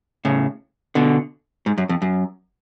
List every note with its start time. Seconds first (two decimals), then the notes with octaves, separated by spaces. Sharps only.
0.25 A2 C#3
0.95 B2 D3
1.66 G#2
1.78 F#2
1.89 F2
2.02 F#2